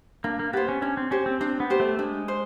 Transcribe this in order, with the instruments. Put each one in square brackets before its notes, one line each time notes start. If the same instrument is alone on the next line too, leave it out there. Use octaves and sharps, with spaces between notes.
[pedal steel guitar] A#3 [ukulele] D4
[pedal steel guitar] A#3
[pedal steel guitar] B3 [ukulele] G4 C5
[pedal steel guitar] C#4
[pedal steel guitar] C#4 [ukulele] D4
[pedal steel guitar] C4
[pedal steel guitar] C#4 [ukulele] G4 C5
[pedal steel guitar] C4
[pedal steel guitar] C4 [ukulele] D4
[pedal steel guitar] B3
[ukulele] G4 C5
[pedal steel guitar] A3
[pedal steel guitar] G#3 [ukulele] D4
[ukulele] C5